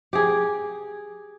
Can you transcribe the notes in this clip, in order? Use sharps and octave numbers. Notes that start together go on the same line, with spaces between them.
G4 G#4